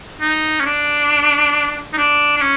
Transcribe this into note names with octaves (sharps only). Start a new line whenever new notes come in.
D#4
C#4
D4
D#4
D4
D4
C#4